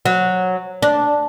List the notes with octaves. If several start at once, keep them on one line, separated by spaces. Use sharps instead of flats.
F#3
D4